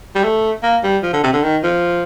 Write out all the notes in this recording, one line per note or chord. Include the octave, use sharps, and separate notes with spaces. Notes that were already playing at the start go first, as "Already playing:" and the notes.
G3
A3
A#3
G3
F3
D3
C3
D3
D#3
F3